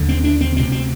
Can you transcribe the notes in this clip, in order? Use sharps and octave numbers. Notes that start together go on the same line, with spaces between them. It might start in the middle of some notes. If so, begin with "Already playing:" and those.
Already playing: D#2 D3
C4
D4
C4
D2 C3 C4
C4